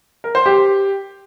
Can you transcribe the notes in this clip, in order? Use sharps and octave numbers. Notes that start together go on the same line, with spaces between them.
A#4
C5
G4